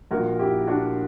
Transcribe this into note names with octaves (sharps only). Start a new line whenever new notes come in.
A#1 A#2 F#4 A#4
E4 G4
D4 F#4